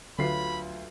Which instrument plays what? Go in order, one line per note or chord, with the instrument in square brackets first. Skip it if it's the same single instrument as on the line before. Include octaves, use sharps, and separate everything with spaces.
[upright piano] D2 F4 C7 [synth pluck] D3 [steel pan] F#3 B4 [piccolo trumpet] B5